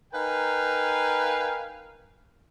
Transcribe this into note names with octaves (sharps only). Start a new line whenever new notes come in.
D#4 A#4 B4 F5 G5 G#5